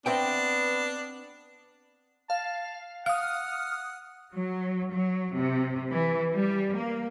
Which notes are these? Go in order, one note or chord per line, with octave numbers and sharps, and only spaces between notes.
B3 C4 D4 E5 G5
F5 A5
F5 F#5 D#6 F6
F#3
F#3
C3
E3
G3
A#3